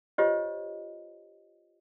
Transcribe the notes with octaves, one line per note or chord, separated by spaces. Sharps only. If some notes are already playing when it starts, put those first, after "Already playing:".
F4 G4 C5 C#5 D#5